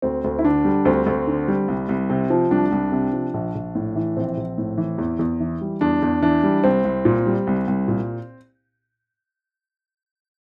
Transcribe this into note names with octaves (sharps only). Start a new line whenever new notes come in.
D2 C4
D2
E4
D3 D4
G3
D2 C4
D2
D3
G3
C2
C2
C3
F3
C2 D4
C2
C3
F3
A#1
A#1
A2
E3
A#1 C4
A#1
A2
E3
E2
E2
E3
G3
E2 D4
E2
E3 D4
G3
C2 C4
C2
A#2
G3
C2
C2
A#2